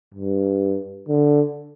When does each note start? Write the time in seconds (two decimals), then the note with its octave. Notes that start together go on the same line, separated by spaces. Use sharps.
0.14 G2
1.08 D3